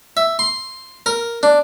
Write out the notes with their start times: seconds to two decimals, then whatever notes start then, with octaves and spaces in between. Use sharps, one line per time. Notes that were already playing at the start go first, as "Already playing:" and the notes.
0.17 E5
0.39 C6
1.06 A#4
1.43 D4